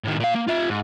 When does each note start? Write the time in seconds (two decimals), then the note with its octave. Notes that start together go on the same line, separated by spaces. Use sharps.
0.04 A2 D#3
0.20 A#2 F5
0.35 A#3
0.47 F4 E5
0.69 G#2